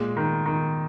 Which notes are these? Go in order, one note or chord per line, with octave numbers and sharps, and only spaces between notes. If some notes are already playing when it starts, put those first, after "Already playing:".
Already playing: A#2 G#3
D#3
D#3